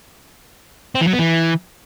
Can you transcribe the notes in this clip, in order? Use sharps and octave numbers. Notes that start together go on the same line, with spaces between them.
C4
E3
F#3
B3
E3